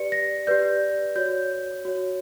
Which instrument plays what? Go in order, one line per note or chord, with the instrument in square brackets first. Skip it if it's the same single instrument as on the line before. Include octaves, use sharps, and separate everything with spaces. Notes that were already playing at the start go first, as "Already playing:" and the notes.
Already playing: [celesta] G4 B4 D5 C#7
A#6
G4 B4 D5 G6
F#4 C#5 G6
F#4 C#5